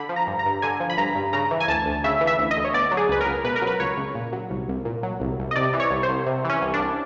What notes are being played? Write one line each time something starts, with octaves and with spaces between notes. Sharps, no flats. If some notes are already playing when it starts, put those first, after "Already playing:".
Already playing: D3 B5
F3
A#5
G2
A#5
G2
D3 G#5
F3
B5
G2 A#5
G2
C#3 A#5
E3
G#5
D2 A5
D2
C#3 E5
E3
E5
D2
D#5
D2
C#5
B2 D5
F#3
G#4
C#2 B4
A#4
C#2
B2 B4
A#4
F#3
B4
C#2 C#5
C#2
A#2
F#3
C2
C2
A#2
F#3
C2
C2
D#5
C3 D5
E3
C#5
C2
C5
C2
C3
E3 C#4
C2
D4
C2